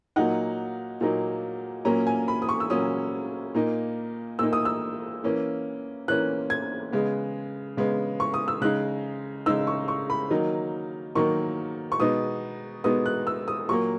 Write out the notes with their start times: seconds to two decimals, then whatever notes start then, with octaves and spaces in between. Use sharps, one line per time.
0.16 A#2 F#3 A#3 D#4 F#5
1.01 A#2 F#3 A#3 D#4
1.85 A#2 F#3 A#3 C#4 A#5
2.07 G#5
2.28 B5
2.42 D#6
2.49 C#6
2.60 E6
2.70 A#2 F#3 A#3 C#4 D#6
3.55 A#2 A#3 D#4
4.39 A#2 A#3 D#4 E6
4.53 D#6
4.65 E6
5.24 E3 A#3 C#4
6.08 E3 A#3 C#4 F#6
6.50 G#6
6.93 C#3 G#3 B3
7.77 C#3 G#3 B3
8.20 C#6
8.34 D#6
8.48 E6
8.61 C#3 G#3 D#4 F#6
9.46 C#3 G#3 D#4 E6
9.67 C#6
9.88 C#6
10.10 B5
10.31 D#3 F#3 A#3 D#4
11.15 D#3 F#3 A#3 D#4 C#6
11.92 C#6
12.00 B2 G#3 B3 D#4 D#6
12.84 B2 G#3 B3 D#4 D#6
13.06 F#6
13.27 E6
13.48 D#6
13.69 A#2 F#3 A#3 C#6